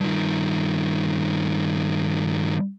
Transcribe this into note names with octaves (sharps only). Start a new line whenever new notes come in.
G2 D#3